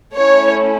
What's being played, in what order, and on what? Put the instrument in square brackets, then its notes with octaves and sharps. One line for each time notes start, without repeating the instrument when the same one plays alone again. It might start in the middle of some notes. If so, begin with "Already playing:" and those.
[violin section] A3 C#4 E4 C#5